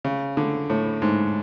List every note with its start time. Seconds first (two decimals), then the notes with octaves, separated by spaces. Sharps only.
0.05 C#3
0.37 D3
0.70 A2
1.02 G#2